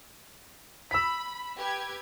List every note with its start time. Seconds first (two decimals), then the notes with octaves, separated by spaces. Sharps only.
0.91 B5 E6 B6
1.58 G4 B4 G#6